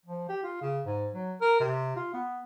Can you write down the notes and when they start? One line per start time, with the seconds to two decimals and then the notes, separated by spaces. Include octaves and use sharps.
0.06 F3
0.29 G4
0.44 F4
0.61 C#3
0.86 G#2
1.13 F#3
1.41 A#4
1.60 C3
1.96 F4
2.14 B3